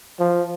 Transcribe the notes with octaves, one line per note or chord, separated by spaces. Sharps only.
F3